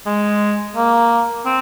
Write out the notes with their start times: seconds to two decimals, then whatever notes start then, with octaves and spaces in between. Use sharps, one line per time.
0.06 G#3
0.76 A#3
1.45 C4